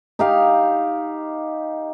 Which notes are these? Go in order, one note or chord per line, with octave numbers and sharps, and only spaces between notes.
D#4 G4 F5